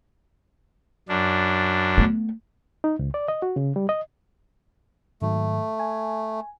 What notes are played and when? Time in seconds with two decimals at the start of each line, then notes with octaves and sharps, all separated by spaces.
1.09 F#2 D4
1.97 A3 B3
2.84 D#4
2.99 C#2
3.14 D5
3.28 D#5
3.42 F#4
3.56 C#3
3.76 G3
3.89 D#5
5.22 G#2 D#3 F#3 A3
5.80 G#5